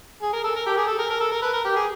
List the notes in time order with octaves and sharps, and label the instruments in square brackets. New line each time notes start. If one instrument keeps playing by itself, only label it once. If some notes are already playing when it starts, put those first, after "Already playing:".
[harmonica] G#4
A#4
A4
A#4
G4
G#4
A4
A#4
A#4
A4
A#4
B4
A#4
G4
G#4